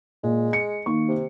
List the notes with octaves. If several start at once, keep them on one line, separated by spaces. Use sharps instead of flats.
A#2 G#3
C#7
D#3 A#3 C#6
C3